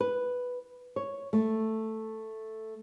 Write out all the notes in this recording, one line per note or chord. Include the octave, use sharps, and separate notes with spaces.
B4
C#5
A3